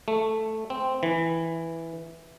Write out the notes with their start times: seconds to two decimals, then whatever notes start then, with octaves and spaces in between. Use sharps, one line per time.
0.08 A3
0.70 C4
1.03 E3